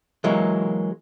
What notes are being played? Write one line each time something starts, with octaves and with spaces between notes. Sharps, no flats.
E3 F#3 G#3 A#3